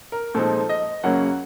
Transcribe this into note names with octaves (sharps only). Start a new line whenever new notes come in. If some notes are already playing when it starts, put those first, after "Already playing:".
A#4
A#2 F3 G#3 C4 D#4 A4
D#5
F#2 C#3 F#3 A#3 C#4 F#5